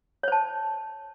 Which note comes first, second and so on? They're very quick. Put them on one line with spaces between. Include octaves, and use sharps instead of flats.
C#5 C5 A5